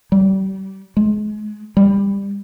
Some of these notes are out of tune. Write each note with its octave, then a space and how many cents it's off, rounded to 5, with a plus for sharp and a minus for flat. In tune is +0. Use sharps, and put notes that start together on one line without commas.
G3 -35
G#3 +30
G3 +20